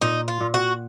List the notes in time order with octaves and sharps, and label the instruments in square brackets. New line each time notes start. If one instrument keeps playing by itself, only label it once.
[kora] A#2 [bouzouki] D#4
[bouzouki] F4
[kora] A#2
[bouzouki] F#4